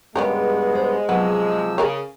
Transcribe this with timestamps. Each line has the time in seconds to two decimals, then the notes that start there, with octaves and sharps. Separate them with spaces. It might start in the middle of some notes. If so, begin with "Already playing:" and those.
0.16 G2 C#3 G#3 B3 C#4 G4 A#4
0.72 G#4 C5
1.09 C3 F3 F#3 B3 E6
1.78 C#3 G#4 A#4 C#5